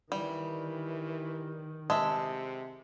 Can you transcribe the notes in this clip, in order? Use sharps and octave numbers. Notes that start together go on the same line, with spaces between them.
D#3 E3 G3
C3 G#3 E5 A5